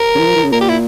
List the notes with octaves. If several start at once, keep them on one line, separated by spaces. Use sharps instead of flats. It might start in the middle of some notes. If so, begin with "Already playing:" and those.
Already playing: A#4
C#3
E3
F3
E3
C#3
A#2 A#4
G4
E4